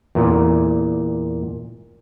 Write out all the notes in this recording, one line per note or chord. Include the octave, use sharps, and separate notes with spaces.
E2 A#2